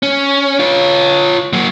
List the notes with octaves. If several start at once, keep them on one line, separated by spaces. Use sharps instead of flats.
C#4
F4 C#5
F#3 A#3